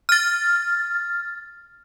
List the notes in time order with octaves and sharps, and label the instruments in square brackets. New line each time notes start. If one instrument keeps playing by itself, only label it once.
[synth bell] F6 A6